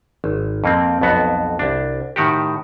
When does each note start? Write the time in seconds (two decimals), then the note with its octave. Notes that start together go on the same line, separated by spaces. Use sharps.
0.24 G#1
0.64 F2 A#3 C4
1.01 B1 F2 B3 F#4
1.59 C2 D4
2.16 A2 D#3 F#4 G4